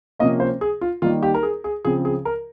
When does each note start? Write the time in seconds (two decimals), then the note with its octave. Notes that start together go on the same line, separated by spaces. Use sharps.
0.19 C3 F3 A#3 C#4 D#5
0.40 C5
0.61 G#4
0.81 F4
1.02 D#3 G3 A#3 D#4 F4
1.23 G4
1.34 A#4
1.43 G#4
1.64 G#4
1.85 C#3 F3 C4 G#4
2.05 G#4
2.25 A#4